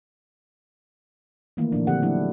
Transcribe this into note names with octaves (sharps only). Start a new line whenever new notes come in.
D#3 E3 A3 A#3 D#4 E4
A#2 F3 D4
D3 F3 C4 G4 A4 F#5
F#3 A3 D4 E4